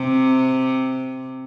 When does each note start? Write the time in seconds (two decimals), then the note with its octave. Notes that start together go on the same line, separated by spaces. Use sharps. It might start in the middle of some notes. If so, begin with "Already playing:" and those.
Already playing: C3